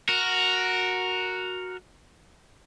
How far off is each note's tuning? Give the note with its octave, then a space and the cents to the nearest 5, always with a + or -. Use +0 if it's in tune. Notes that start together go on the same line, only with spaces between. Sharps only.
F#4 -5 A#4 +0